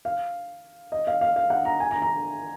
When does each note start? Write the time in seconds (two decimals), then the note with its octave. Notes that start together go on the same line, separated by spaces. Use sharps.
0.05 F5
0.92 D#5
1.07 F5
1.21 F5
1.36 F5
1.50 F#5
1.65 A#5
1.80 G#5
1.91 A#5
2.02 A#5